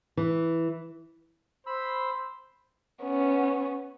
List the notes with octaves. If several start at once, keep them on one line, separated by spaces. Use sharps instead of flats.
E3
C5 B5 E6
B3 C#4